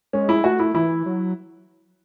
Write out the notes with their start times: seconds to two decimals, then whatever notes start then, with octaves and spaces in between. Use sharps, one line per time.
0.13 G#3 C#4
0.29 E4
0.44 A3 F#4
0.60 E4
0.75 E3 E4
1.06 F#3